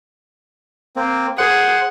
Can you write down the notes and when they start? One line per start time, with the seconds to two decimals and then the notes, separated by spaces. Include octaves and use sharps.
0.96 A#3 C4
1.38 G#4 C5 F#5